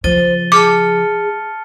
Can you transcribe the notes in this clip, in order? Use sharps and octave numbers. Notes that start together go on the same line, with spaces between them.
C#3 F3 C5 A6 D#7 G7
G#4 A5 D6 F6 C#7